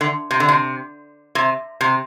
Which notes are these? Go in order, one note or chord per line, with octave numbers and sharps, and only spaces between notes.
D3
C3
D3
C3
C3
C3